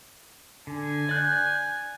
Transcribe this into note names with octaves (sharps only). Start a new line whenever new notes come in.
D3 G#5
D5 F#6 G6